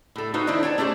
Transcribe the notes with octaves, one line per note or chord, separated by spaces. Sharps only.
A2 A4
D#4 F#4 B4 C5 F5
D#3 D4 E4 C5 D#5
C#5 D5 G#5 A5
A3 C#4 G4 G#4 C5